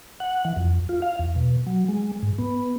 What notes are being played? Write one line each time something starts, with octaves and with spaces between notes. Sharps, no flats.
F#5
E3
F2
F4
F5
E2
B2
F#3
G#3
G#2
B3